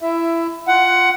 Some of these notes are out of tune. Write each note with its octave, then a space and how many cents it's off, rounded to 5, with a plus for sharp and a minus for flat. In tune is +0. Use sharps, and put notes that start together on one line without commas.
E4 +20 E5 +10
F4 +0 F#5 +15